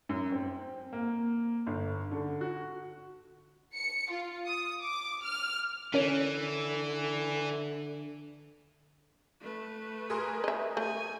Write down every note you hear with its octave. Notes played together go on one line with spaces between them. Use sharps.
F#2
C4
A#3
G1
D3
F#4
C#7
F4
D#6
D6
F6
D3 E3 C#4 A#4 C#5
A3 B4
G#4 A#4 C6
D#5 E5
A3 G#5